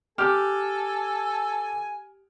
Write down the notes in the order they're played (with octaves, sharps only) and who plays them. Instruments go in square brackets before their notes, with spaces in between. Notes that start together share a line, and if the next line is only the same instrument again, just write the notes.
[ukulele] G4 [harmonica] A4 G#5 [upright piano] D6 F6